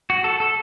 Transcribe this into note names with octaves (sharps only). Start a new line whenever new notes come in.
F#4
A4
A4